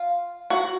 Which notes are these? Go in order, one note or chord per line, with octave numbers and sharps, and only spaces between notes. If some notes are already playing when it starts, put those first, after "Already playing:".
Already playing: F4
F#4